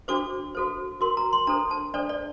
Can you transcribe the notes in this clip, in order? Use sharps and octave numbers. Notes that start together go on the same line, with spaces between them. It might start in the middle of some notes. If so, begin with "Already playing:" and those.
D4 F#4 A4 C5 D6
F#4 A4 C5
F#4 A#4 C6
A#5
C6
D4 A4 C5 A#5
A5
D4 A4 C5 D5
D5